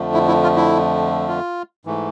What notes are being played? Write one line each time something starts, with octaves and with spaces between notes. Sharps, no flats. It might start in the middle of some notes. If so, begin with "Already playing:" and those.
Already playing: F2 D3 F3 A3
E4
E4
F4
E4
F4
G#2 E3 A3